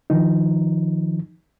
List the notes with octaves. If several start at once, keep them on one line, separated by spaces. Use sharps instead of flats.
D#3 F3 D#4